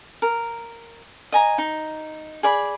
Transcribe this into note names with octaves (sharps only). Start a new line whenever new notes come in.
A#4
D#5 G#5 A#5
D#4
G#4 D5 B5